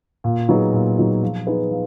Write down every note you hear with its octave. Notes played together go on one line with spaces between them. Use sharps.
A#2
F#3 B3 D#4 G#4
A#2
F#3 B3 D#4 G#4
F3
B3 D#4 G#4 B4
F3